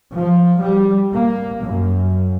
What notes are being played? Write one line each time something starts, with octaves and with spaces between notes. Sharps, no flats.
F3
G3
A#3
F#2